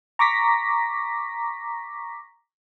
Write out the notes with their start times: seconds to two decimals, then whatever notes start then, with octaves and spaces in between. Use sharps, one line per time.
0.19 A#5 C#6 D6 A#6 B6